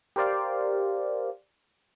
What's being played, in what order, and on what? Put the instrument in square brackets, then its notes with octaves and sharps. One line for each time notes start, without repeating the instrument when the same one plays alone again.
[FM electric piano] G4 A#4 C5 D5 F5